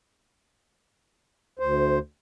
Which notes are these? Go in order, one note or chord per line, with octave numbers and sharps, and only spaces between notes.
D2 C5